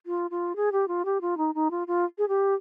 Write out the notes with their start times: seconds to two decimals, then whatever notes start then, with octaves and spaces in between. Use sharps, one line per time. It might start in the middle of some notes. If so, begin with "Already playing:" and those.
0.06 F4
0.31 F4
0.56 G#4
0.72 G4
0.88 F4
1.05 G4
1.21 F4
1.37 D#4
1.55 D#4
1.71 F4
1.87 F4
2.18 G#4
2.28 G4